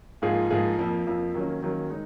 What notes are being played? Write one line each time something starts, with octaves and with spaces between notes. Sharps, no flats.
G#2 F3 A#3 F4 G#4
G#2 F3 A#3 F4 G#4
F2 F3 A#3
F2 F3 A#3
D#3 F#3 A#3 C#4
D#3 F#3 A#3 C#4
G#3 D#4